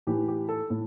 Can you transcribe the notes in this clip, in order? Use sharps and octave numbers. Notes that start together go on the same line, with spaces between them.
A2 E3 G4
G4
A4
A2